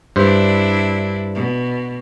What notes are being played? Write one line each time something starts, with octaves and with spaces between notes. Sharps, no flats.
G2 D4 E4 C5
B2